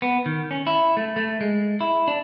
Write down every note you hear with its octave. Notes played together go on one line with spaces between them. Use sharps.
B3
D#3
C#4
E4
A3
A3
G#3
E4
D4